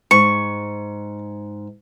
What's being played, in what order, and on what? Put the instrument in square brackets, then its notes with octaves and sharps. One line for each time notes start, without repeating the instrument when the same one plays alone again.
[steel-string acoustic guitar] G#2 [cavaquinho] C#6 [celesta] C#7